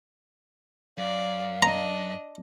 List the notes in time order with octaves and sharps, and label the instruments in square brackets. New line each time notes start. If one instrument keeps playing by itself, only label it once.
[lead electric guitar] F#2 [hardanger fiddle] D5 [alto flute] F5
[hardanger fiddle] D4 D#5 [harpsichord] A#5